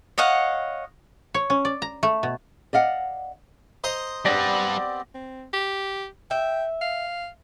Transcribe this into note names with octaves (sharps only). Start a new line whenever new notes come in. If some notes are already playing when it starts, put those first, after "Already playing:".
C#5 D#5 F5 F#5
C#5
C#4
D5
A#5
A3
B2
D5 D#5 F5 F#5
C5 D#5 A#5
G3 B3 C4 G4 B4 D5 A#6
C4
G4
E5 G5
F5